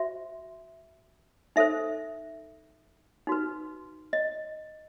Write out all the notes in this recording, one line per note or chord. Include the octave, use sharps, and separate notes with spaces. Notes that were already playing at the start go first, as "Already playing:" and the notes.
Already playing: F#4 C5 E5
D#4 A4 C5 E5
D#4 F#4 B4
D#5